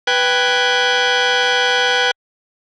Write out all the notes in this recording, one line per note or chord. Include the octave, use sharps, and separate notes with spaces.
B4 G5 F#6 G#6